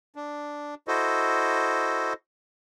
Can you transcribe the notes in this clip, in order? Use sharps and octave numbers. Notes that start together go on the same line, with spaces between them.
D4
E4 F#4 A4 C5 D#5